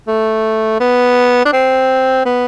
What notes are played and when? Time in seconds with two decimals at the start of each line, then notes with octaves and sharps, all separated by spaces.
0.08 A3
0.80 B3
1.45 D4
1.53 C4
2.25 B3